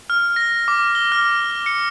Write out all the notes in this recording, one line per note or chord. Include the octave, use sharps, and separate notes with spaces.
F6
A#6
D6
G7
F6
C#7